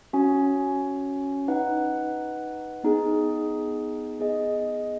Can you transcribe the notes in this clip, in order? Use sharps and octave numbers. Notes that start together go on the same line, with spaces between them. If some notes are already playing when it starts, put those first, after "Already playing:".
C#4 F#4 C#5
D#4 B4 F#5
B3 D#4 G#4
B3 G#4 D#5